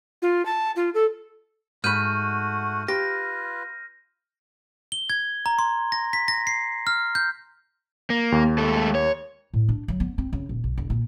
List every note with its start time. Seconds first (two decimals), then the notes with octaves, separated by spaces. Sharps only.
0.22 F4
0.45 A5
0.76 F4
0.94 A4
1.84 G#2 A3 F#4 F#5 B5 F6 G6 D#7
2.88 F4 G4 B4 A#6
4.92 G7
5.10 G#6
5.46 A#5
5.59 C6
5.92 A#6
6.13 B6
6.28 A#6
6.47 C7
6.87 F6
7.15 G6
8.10 A#3
8.32 D#2
8.58 G#3 A3 A4
8.95 C#5
9.54 A2
9.69 D4
9.88 F#3
10.00 B3
10.18 C4
10.33 C#3
10.49 D#1
10.64 B1
10.78 E1
10.90 A#2